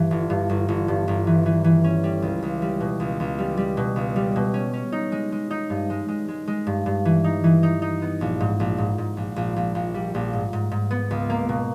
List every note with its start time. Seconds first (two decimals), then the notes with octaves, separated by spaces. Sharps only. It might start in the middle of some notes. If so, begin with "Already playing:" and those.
Already playing: G2 E3
0.11 G1
0.30 G2
0.49 G1
0.68 G1
0.88 G2
1.08 G1
1.27 E3
1.46 E3
1.64 E3
1.84 C#4
2.04 G3
2.22 C#2
2.42 C#2
2.62 G3
2.80 B2
3.00 C#2
3.20 C#2
3.39 G3
3.57 G3
3.77 B2
3.96 C#2
4.16 G3
4.36 B2
4.54 C#4
4.73 C#4
4.92 D#4
5.12 G#3
5.32 G#3
5.51 D#4
5.70 G2
5.90 G#3
6.08 G#3
6.28 G#3
6.48 G#3
6.67 G2
6.86 G2
7.05 E3
7.24 D#4
7.44 E3
7.63 D#4
7.82 D#4
8.02 B3
8.21 A#1
8.40 G#2
8.60 A#1
8.78 G#2
8.98 G#2
9.17 A#1
9.36 A#1
9.56 A#1
9.75 A#1
9.94 G3
10.15 A#1
10.33 G#2
10.53 G#2
10.71 G#2
10.91 B3
11.11 C#2
11.30 A#3
11.49 B2